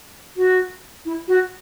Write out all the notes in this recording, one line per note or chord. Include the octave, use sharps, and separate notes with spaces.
F#4
E4
F#4